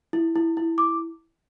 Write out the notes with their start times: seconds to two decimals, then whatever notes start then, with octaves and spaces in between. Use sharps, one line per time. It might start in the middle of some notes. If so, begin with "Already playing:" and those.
0.13 E4
0.36 E4
0.57 E4
0.78 D6